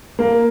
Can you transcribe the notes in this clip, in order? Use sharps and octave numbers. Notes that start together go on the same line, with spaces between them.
A#3